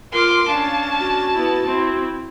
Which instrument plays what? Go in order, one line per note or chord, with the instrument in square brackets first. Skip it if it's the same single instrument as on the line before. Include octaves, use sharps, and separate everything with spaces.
[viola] F4 [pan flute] A#4 [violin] C6 D6
[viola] C#4 D4 [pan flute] F5 [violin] A5
[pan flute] F#4
[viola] B3 E4
C4 E4